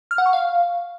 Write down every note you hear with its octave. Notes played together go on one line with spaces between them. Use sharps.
F6
F#5
C#6
F5